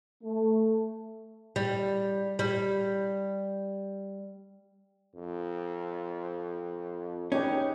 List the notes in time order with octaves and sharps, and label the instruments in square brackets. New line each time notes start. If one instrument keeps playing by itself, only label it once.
[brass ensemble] A3
[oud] G3
G3
[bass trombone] F2
[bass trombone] G#1 [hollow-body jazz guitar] C#4 [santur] D#4 G4 B4